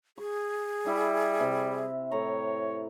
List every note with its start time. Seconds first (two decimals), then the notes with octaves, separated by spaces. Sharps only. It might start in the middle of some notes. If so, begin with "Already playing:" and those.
0.18 G#4 C#6
0.86 G3 E4 E5
1.40 C3
2.11 A2 C#5 A#5